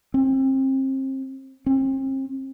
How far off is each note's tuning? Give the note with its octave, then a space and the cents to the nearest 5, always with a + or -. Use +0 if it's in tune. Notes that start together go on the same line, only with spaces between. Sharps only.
C4 +30
C4 +40